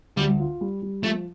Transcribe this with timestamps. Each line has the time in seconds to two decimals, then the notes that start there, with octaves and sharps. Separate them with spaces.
0.17 D2 G3
0.40 F4
0.61 G3
0.82 G3
1.03 F3 A3